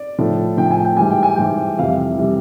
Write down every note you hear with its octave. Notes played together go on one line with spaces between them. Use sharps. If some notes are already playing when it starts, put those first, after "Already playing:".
Already playing: D5
A2 F3
A2 F3 G5
G#5
G5
G#2 E3 G3 G#5
G5
G#5
G#2 E3 G3 G5
F2 C3 E3 G3 F5
C3 E3 G3